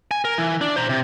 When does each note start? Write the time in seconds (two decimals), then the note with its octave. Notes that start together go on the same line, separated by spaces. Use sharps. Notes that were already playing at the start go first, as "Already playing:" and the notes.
0.11 G#5
0.25 A#4
0.38 E3
0.61 D4
0.76 C5 A#5
0.89 C3